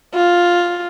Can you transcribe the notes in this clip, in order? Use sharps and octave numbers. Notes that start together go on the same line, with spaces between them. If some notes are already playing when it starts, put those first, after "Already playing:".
F4